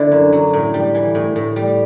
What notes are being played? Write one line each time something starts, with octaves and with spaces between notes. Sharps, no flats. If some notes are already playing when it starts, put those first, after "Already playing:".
Already playing: D3 D4 E4 F#4
F#2
F#3
A2
G3
E3
A2
A2
G3